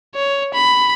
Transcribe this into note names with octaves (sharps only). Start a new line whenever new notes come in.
C#5
B5